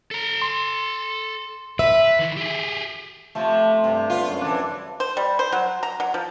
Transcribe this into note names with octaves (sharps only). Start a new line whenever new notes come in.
A4 A#5
C6
B4 E5
D#3 E3
G4 G#4
C3 F3 A3 C4
G2 C3
B3 F4
F#2 C#5
C3 E3 D4
C5
G3
C5
F#3
A#5
F#3
F3